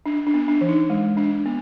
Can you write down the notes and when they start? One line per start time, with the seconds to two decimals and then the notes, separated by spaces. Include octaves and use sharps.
0.06 D4
0.27 D4
0.34 B3
0.48 D4
0.61 E3
0.68 D#4
0.90 G#3
1.17 D4
1.46 B3